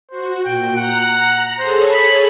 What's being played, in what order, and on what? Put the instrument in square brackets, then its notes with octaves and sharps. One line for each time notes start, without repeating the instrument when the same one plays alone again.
[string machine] F#4 [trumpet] C5
[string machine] A#2 [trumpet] G5
[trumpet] F#5 [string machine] A#5 F#6 A#6
[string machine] G#4 A4 C#5 [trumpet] C5
[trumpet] B5